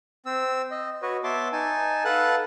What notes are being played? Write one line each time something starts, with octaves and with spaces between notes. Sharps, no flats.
C4 E6
D#5
F#4 B4 C#5 D#5
B3 C#5 E5 A5 C6 D6
D#4 G#5 A5
A4 B4 F5 F#5 A5 F#6